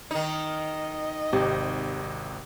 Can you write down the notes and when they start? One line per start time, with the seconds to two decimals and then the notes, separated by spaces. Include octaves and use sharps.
0.11 D#3 D#4 D#5
1.33 G#1 C3 G4